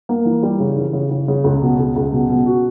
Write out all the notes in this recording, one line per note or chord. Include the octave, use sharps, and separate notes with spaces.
A#3
E3
G3
C#3
E3
C#3
C#3
C#3
C#2
B2
C#2
C#2
B2
B2
F#4